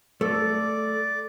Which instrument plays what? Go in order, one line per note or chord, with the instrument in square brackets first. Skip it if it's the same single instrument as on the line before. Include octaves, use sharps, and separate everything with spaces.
[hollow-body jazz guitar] A3 [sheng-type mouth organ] D5